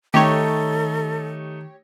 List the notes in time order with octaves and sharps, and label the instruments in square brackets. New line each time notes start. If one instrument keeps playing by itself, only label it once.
[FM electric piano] D#3 [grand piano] A3 D#4 [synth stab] G4 C#5 [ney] A4